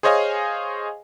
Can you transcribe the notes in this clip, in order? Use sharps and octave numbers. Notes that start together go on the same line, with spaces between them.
G#4 C5 C#5 D#5 F5 G#5